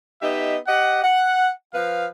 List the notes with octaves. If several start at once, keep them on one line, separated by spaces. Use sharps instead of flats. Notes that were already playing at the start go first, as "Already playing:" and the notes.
B3 D#4 G4 D#5 E5
G4 D#5 F#5
F#5
F3 B4 F5